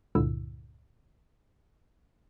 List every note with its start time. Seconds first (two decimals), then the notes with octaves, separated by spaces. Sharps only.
0.15 C#2 G2 A#2 D3 E4 E6